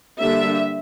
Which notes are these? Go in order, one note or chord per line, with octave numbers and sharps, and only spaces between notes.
D3 G3 A#3 D4 E5